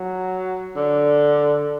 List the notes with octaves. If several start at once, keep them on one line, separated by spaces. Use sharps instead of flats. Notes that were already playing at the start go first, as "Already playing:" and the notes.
Already playing: F#3
D3